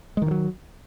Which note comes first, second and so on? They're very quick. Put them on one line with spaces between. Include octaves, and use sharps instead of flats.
G#3 D#3 E3 F#3